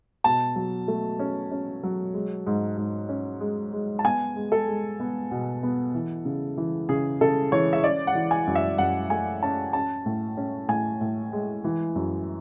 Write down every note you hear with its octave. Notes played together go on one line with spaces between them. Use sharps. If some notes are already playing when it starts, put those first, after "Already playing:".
B2 A5
F#3
A3
C#4
C#4
F#3
G#3
G#2
G#2
C#4
G#3
G#3
A5
B3 G#5
G#3
A4
G#3
B3
B2
B3
E3
C#3
E3
C#3 G#4
C#3 A4
E3 C#5
E5
C#4 D5
F#5
E3
G#5
F#2
E5
F#2 F#5
A3 G#5
C#4 A5
C#4 A5
A2
C#4
A2 G#5
A2
G#3
E3
F#2